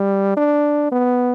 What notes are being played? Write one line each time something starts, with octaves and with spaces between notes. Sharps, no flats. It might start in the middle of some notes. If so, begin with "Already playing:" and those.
Already playing: G3
D4
B3